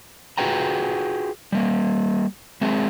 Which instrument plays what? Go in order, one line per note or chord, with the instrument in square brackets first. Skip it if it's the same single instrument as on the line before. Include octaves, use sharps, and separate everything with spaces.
[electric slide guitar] F4 F#4 G#4 B4 G5 A#5
G3 A#3
G#3 C4 G#4 E5